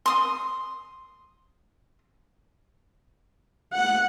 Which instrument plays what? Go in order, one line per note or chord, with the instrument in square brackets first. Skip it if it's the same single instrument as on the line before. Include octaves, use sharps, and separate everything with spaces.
[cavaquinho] C6 D#6
[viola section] F#5